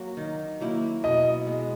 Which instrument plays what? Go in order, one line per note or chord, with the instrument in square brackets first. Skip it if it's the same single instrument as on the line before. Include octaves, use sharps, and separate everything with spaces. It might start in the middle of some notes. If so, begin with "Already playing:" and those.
Already playing: [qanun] F#3 A#3
D#3
F#3 A#3 E4
[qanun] B2 [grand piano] D#5
[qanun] G#3 B3